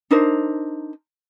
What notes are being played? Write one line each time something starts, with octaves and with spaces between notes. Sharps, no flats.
D4 D#4 A#4 C5